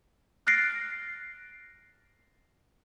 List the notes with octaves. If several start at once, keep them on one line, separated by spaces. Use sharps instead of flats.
F6 F#6 A6 A#6 C7 D7